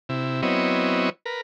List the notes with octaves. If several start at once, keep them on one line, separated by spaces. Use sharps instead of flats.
C3 E4
F#3 B3 C4 E4 C#5 D#5
A#4 B4